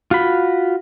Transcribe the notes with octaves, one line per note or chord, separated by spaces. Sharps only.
F4 F#4 B5